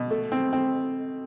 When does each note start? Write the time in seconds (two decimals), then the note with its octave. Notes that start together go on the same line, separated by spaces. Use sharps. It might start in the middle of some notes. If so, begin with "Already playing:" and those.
Already playing: B2
0.11 A3
0.32 C4
0.53 C4